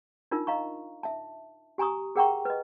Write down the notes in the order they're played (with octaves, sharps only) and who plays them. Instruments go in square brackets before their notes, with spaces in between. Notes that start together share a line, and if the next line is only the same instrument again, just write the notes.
[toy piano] D4 D#4 F4 A#4
D#5 F5 A#5 C#6
E5 A5
G4 G#5 A#5 C#6 D#6
G#4 A#4 F#5 G5 A#5 C#6
B4 D#5